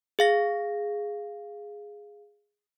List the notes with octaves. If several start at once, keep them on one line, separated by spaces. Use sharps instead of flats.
G#4 F5 A#6